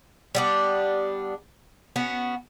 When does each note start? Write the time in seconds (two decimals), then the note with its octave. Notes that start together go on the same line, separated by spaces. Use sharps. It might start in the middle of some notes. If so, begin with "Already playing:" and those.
0.35 G3 B3 D4
1.96 B3 C#4 F#4